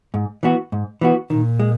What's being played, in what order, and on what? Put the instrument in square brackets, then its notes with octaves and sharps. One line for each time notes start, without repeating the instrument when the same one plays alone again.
[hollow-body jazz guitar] G#2
E3 B3 F#4
G#2
E3 B3 F#4
[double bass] A#2 [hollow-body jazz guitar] D#3
[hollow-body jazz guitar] G#3